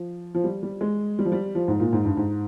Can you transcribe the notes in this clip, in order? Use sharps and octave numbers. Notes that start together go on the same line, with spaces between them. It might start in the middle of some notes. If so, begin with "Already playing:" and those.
Already playing: F3
F3
G3
G3
G#3
G3
F3
G3
F3
G#2
A#2
G#2
G2
G#2